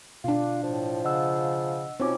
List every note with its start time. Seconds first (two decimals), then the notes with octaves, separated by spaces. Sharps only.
0.24 B2 D4 F4
0.63 A2 F3
1.05 C#3 D#5 F#5 E6
2.00 B2 C4 C#4 D#4 F4 D6